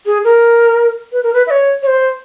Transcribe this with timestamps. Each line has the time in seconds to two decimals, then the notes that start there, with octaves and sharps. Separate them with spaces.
0.06 G#4
0.24 A#4
1.12 B4
1.23 A#4
1.33 B4
1.47 E5
1.51 C#5
1.83 C#5
1.87 C5